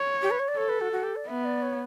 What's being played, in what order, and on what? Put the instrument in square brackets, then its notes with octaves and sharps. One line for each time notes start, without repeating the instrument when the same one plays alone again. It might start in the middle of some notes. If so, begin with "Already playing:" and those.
Already playing: [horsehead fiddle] C#5
[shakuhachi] G4
B4
C#5
D5
[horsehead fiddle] A4 [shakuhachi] C#5
[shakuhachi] B4
F#4
F#4
G4
D5
[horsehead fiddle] B3 [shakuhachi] E5
[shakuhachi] D5
C#5